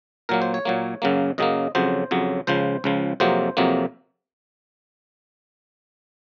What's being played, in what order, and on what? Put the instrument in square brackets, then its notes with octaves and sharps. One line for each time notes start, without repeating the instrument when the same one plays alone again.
[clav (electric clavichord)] A#2 F#3 A#3 A#4
C5
C#5
A#2 F#3 A#3
F#2 C#3 F#3 A#3
F#2 C#3 F#3 A#3 D#5
F2 C#3 F#3 C5
F2 C#3 F#3
C#2 C#3 F3 C5
C#2 C#3 F3
F2 C3 F#3 A#3 C5
F2 C3 F#3 A#3